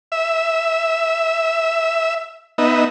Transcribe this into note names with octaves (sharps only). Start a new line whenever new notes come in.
E5
B3 D#4 E5